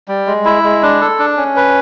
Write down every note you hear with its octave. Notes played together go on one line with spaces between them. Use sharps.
G3
G#3
E4
G#3
D4
A4
D4
C#4
B4